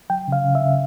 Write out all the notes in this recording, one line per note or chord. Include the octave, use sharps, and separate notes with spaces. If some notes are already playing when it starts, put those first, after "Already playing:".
F#3 G5
C#3 F5
C#3
E5
C#3